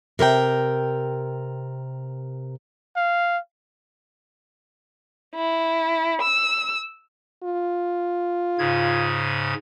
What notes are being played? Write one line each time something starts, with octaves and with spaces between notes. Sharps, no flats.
C3 A#4 C5 G5
F5
E4
E6
F4
G#2 C#3 G#6